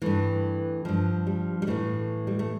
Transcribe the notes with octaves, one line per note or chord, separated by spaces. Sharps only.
G2 E3 A3
G2 F3
G3
G3
A2 E3 A3
G3
A3